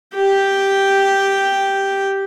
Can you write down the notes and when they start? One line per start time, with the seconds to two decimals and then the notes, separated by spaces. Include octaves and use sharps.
0.15 G4 G5